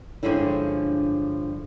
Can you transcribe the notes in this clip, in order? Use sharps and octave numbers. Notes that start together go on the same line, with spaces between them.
G2 D3 F3 G#3 C#4 E4